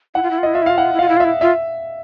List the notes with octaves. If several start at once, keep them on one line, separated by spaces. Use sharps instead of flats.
E4 F#5
F4
E4
F4
E4 D#5
F4 E5
E4
F4 F5
E4 F#5
F4
E4
F4 F5
E4
F4
E4 E5
F4 E5